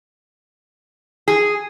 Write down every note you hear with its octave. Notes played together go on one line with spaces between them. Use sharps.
G#4